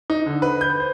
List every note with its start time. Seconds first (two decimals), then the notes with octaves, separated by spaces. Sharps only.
0.10 D#4
0.26 D3
0.42 B4
0.61 G6
0.80 C5